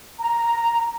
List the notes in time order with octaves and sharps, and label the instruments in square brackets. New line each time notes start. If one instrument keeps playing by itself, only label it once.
[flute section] A#5